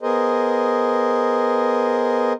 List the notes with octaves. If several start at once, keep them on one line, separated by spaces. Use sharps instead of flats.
B3 G#4 A#4 C5 D#5